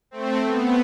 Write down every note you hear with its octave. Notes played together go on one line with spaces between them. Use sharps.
A3 C4
B3